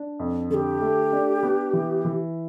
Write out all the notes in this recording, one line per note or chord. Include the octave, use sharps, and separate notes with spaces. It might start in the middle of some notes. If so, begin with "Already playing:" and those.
Already playing: D4
F2
D3 G4 A4
A3
D4
B3
E3
E3